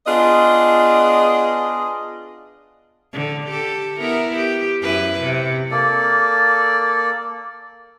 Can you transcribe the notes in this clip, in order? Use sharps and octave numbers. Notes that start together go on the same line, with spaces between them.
B3 D4 F4 G#4 D5 D#5
D3
G4 A4
B3 E4 A#4
G4
F#2 E4 B4
C3
A#3 A4 D5